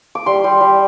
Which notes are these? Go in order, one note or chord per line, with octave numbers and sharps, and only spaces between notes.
D6
G3 C6
G3
G3